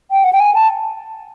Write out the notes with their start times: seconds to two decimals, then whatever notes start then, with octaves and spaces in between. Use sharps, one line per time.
0.11 G5
0.24 F#5
0.33 G5
0.40 G#5
0.55 A5